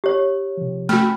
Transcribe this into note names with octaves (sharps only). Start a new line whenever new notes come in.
G4 C#5
C3 F3
A3 C#4 F#4 G5 B5 F6